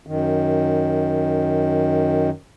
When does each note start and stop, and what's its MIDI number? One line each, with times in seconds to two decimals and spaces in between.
0.07 2.30 42
0.07 2.30 51